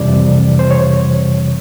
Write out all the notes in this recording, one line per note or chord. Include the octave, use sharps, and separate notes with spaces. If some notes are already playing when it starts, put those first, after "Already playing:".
Already playing: F2 C3 E3 G3 D5
C5
C#5